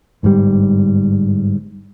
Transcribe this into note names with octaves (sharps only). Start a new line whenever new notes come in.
G1 G#2 B2 G3